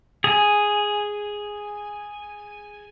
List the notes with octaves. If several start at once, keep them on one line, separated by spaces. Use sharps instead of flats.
G#4 G#5